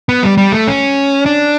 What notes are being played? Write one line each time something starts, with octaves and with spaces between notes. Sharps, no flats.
B3
G3
G3
A3
C#4
D4